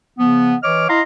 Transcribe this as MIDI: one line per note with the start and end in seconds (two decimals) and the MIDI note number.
0.19 0.54 49
0.19 0.54 53
0.19 0.54 59
0.63 0.87 52
0.63 0.87 73
0.63 0.87 75
0.63 0.87 86
0.63 0.87 89
0.89 1.01 64
0.89 1.01 75
0.89 1.01 77
0.89 1.01 82
0.89 1.01 84